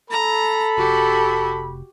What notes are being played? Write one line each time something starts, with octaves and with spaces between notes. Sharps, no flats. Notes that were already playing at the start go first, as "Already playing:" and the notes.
A4 A#5 B5
F1 F#4 G4